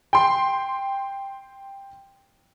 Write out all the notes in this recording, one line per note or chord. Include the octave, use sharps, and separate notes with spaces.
G5 C6